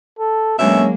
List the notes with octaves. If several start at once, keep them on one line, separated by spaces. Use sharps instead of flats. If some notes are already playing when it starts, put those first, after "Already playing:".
A4
D2 B2 F#3 G#3 A#3 C#4 E5